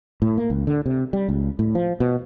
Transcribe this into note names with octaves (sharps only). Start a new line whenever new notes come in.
A2
A#3
C#2
D3
C3
G3
C#2
A2
F3
B2